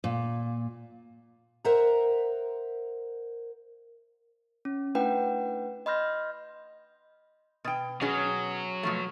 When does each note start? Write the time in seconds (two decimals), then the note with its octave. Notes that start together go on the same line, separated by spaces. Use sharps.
0.04 A#2
1.65 A#4 C5 E5 F#5 A#5
4.65 C#4
4.95 A3 D4 E4 B4 F#5 G5
5.86 D#5 B5 C6 F6 G6 A#6
7.64 B2 G5
8.01 B2 F#3 C#4 G#4
8.83 B2 F3 A3